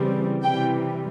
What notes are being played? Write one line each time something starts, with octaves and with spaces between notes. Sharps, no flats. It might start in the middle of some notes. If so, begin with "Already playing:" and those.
Already playing: C#3 E3 G3 C4
C3 E3 G3 G5